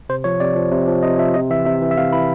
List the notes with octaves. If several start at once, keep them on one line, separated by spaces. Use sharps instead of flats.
C3 C5
F3 C#5
C3 D5
F3
C3
F3
C3 D#5
F3 E5
C3 D#5
E3 E5
C3 E5
E3
E5
C3 F5
E3 B5